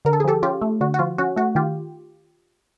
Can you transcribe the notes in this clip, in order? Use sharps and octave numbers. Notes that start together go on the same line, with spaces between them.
D3 A#4
A4
G#4
F3 G4 A4
C#4 F4 G4
A3
D3 F#4
F#4
F3 F4
C#4 F#4
A3 F#4
D#3 F4 G4